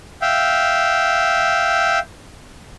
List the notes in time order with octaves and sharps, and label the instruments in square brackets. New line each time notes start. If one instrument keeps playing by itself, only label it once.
[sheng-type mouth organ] E5 F5 G5